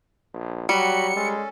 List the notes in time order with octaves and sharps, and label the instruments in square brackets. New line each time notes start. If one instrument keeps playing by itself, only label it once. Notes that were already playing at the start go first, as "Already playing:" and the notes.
[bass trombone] A#1
[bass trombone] F#3 [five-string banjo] G3 [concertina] F#4 B5 [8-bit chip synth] C#7
[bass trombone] G#3 [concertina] C#4 A4